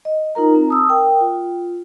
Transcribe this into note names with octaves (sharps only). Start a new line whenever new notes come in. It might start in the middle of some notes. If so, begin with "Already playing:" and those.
D#5
D#4 F4 A#4 A#5
C4
A5 D#6 E6
A#4 G5
F4